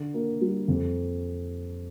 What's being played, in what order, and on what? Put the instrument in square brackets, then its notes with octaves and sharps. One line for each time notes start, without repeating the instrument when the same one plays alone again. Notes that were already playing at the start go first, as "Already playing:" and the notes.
Already playing: [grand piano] D3
A#3
G3
F2